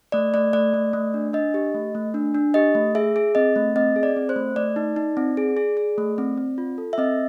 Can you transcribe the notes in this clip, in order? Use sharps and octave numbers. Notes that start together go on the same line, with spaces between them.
A3 D5
A3 D5
A3 D5
A3
A3
D4
D4 D#5
G4
A3
A3
D4
D4
G4 D#5
A3
G#4 E5
G#4
C4 D#5
A3
C4 D#5
G#4
D5
C4
C5
A3
A3 D5
D#4
D#4
C4
G#4
G#4
G#4
A3
C4
C4
F4
A4
E5
C4 D#5